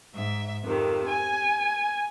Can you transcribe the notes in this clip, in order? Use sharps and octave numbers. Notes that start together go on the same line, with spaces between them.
G#2 E5
F2 C3 D#3
G#5